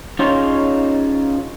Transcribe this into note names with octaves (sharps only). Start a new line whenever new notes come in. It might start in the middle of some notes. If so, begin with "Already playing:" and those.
C#4 D#4 F4 G#4 C5 C#5